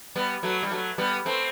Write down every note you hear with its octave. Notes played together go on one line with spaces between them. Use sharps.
G3 B3
F#3 A3
G3
F#3 A3
G3 B3
A3 C4